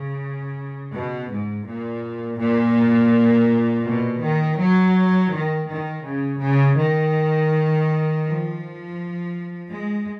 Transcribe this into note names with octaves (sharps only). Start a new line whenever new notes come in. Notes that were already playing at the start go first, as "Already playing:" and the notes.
Already playing: C#3
B2
G#2
A#2
A#2
B2
D#3
F#3
D#3
D#3
C#3
C#3
D#3
F3
G#3